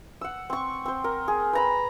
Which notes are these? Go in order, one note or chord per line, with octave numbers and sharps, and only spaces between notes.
F#5 E6
C4 C#6
C4 C5
A#4
G#4
B4 A#5 B5